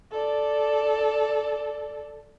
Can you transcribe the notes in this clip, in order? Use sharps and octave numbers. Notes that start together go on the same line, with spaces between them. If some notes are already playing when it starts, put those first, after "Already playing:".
A4 D5